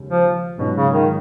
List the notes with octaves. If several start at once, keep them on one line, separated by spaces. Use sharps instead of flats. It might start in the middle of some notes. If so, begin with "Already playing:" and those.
Already playing: D#2 C#3 G#3
F3
G#2 B2 F#3 C#4 F4
C#3
D#3